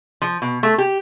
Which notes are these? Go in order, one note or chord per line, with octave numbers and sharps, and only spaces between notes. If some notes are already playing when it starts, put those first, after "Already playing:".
F3
B2
A3
G4